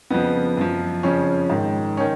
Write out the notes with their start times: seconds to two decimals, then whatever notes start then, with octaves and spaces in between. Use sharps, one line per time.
0.10 F2 C#3 F3 B3
0.57 F#2 F3
1.03 F2 C#3 F3 C#4
1.50 G#2 D#3
1.97 C#4
2.00 D#3